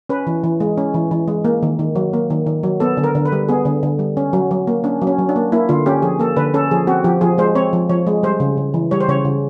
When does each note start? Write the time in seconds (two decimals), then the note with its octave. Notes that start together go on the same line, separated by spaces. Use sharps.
0.09 C#4 B4
0.27 E3
0.44 E3
0.60 G#3
0.78 C#4
0.94 E3
1.11 E3
1.28 G#3
1.45 A#3
1.62 D#3
1.79 D#3
1.96 F#3
2.13 A#3
2.30 D#3
2.46 D#3
2.63 F#3
2.80 B3 A4
2.97 D3
3.04 A#4
3.15 D3
3.25 B4
3.32 G3
3.49 B3 G#4
3.65 D3
3.83 D3
3.99 G3
4.17 C#4
4.33 F#3
4.51 F#3
4.67 A#3
4.84 C#4 D4
5.02 F#3
5.07 C#4
5.18 F#3
5.29 D4
5.36 A#3
5.52 A#3 E4
5.69 D3 F4
5.86 C#4 G4
6.02 F3 G#4
6.19 A#3 A4
6.36 D3 B4
6.54 C#4 A4
6.71 F3 G#4
6.87 C4 F#4
7.04 F3 G4
7.21 F3 G#4
7.38 G#3 C5
7.55 C4 C#5
7.73 F3
7.90 F3 C#5
8.07 G#3
8.23 G3 C5
8.40 C#3
8.57 C#3
8.74 E3
8.91 G3 C#5
9.01 C5
9.08 C#3 C#5
9.25 C#3